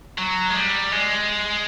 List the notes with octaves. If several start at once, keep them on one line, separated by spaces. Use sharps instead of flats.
F#3
G#3
G3
G#3